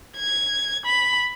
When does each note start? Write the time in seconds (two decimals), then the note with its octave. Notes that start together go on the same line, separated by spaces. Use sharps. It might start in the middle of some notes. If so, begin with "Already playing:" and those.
0.16 G#6
0.84 B5